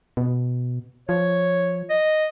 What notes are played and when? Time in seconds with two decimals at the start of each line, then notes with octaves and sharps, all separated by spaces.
0.17 B2
1.09 F3 C#5
1.90 D#5